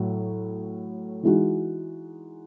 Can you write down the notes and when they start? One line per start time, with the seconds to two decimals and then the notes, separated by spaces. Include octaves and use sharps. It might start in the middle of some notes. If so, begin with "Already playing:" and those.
Already playing: A2 F#3
1.23 E3 G#3 D#4 F#4